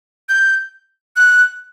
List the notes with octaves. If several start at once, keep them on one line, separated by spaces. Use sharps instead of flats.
G6
F#6